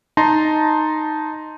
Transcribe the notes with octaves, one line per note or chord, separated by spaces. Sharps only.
D#4 A5 A#5 C6